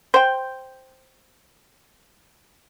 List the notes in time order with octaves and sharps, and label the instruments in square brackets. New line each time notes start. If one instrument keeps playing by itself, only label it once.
[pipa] C5 G5